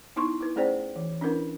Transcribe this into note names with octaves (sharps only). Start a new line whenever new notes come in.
B3 D#4 E4 C6 C#6
E4 B4
A3 C#4 G#4 C5 D5 G5
E3
C#4 D4 E4 A#4 B4